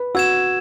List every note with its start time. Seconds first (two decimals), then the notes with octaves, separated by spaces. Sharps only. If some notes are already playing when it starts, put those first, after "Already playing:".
Already playing: B4
0.15 F#4 E6 G#6 E7